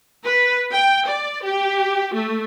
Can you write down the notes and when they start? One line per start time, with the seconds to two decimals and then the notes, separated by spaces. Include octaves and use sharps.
0.24 B4
0.72 G5
1.08 D5
1.44 G4
2.13 A3